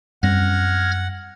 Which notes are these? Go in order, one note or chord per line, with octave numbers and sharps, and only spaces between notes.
F#2 G3 C4 F#5 F6 G#6 A#6